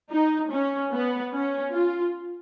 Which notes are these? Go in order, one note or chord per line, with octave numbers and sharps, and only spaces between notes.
D#4
C#4
B3
C#4
F4